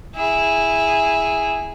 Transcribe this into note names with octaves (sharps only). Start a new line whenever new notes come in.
E4 G#4